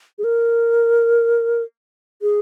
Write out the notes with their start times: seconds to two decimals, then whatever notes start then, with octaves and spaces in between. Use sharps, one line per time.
0.18 G#4
0.24 A#4
2.22 G#4